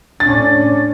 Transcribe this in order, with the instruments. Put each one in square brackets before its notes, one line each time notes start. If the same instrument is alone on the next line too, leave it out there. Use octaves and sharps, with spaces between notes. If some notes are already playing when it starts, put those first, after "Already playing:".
[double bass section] A2 C#4 [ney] D4 [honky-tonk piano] A6